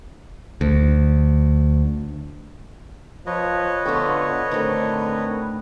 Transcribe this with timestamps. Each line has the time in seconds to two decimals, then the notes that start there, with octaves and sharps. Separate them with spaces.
0.61 D2
3.26 F3 B4 C#5 D#5
3.86 D3 B3 F4 F#4
4.51 A2 D3 D#3 C4